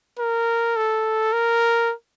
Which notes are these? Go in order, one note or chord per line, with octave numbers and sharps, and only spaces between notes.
A#4
A4
A#4